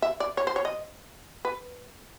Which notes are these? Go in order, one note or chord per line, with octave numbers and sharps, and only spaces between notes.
E5
D5
C#5
C5
C#5
D#5
B4